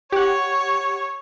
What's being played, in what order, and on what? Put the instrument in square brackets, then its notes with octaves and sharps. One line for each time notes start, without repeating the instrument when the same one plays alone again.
[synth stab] G4 F#5 [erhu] C#5